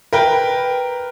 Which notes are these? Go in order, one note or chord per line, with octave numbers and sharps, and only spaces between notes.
A#4 B4 G5